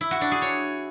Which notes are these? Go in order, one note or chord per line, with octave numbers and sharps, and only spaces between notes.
E4
F#4
D4
G#4
C#5